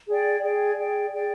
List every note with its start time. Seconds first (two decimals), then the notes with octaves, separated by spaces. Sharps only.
0.07 G#4 D5 G5
0.43 G#4 D5 G5
0.78 G#4 D5 G5
1.13 G#4 D5 G5